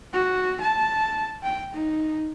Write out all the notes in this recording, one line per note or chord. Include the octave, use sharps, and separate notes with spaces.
F#4
A5
G5
D#4